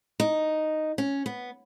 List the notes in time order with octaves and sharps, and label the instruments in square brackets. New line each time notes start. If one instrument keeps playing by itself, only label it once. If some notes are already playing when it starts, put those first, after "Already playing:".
[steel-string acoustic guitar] D#4
C#4
B3